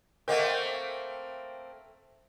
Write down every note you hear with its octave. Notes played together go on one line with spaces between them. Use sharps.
A3 A#3 C4 A#4 D#5 F#5